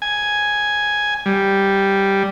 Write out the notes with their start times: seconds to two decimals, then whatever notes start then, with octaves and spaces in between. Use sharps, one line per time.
0.02 G#5
1.26 G3